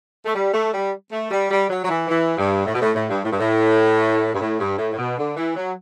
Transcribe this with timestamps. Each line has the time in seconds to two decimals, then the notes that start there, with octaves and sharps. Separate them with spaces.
0.25 A3
0.35 G3
0.53 A3
0.73 G3
1.12 A3
1.31 G3
1.51 G3
1.70 F#3
1.84 F#3
1.89 E3
2.08 E3
2.37 G2
2.66 A2
2.74 B2
2.81 A2
2.95 A2
3.09 G2
3.24 A2
3.32 G2
3.39 A2
4.34 G2
4.40 A2
4.59 G2
4.78 A2
4.93 A2
4.98 B2
5.17 D3
5.36 E3
5.56 F#3